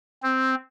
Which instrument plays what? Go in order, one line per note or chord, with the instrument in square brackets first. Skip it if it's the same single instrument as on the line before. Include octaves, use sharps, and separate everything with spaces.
[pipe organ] C4